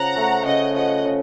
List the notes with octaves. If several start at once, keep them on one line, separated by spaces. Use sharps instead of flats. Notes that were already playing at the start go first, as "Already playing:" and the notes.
Already playing: C#3 F3 F#5 A#5
A3
C#3 D#5 F#5
F3 D#5 F#5
C#3